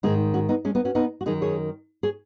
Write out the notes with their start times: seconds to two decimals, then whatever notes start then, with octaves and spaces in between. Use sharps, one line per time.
0.03 G#2 D#3 D#4 G#4
0.34 C#4 F#4
0.49 B3 D#4
0.65 G#3 C#4
0.75 B3 D#4
0.85 C#4 F#4
0.95 B3 D#4
1.21 F#4
1.26 F#2 D#3 D#4 G#4
1.42 G#4 C#5
2.03 G#4 C#5